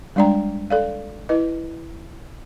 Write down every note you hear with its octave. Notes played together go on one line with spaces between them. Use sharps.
G3 G#3 D4 D5 G5 A#5
A4 D5 F5
E4 B4 D#5